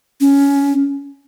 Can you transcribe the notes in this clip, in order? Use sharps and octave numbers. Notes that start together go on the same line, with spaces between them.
C#4